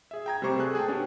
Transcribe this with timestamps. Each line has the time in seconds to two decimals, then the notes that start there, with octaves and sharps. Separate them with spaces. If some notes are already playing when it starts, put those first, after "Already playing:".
0.11 G#4 E5
0.26 G5 A#5 G#6
0.42 C3 G3 A3 C5 C#6 D6
0.59 G#4 A4 G#5 F#6
0.75 G#4 G5 A5
0.88 B3 C#4 D4 F#4 G4